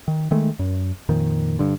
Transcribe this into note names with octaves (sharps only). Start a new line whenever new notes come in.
D#3
D#3 G#3 A3
F#2
F2 A#2 D#3
G2 D3